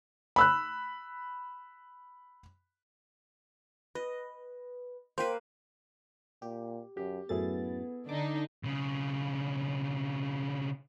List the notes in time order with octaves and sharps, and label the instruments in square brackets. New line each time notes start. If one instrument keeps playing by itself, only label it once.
[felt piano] B5 E6 F#6
[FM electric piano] B4 [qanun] D#5
[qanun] A#3 B4 [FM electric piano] C5 G5
[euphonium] A#2 [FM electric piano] G4
[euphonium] F#2 [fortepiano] G4
[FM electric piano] F#2 A2 A6 [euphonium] B3 [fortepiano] E4 G#4 A4
[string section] D3 D4 D#4 [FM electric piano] D6
[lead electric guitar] B1 C#3